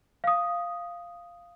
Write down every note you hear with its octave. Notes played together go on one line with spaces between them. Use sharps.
F5 D#6